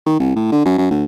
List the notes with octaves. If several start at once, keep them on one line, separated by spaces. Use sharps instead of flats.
D#3
C2
A2
D3
F#2
F#2
D2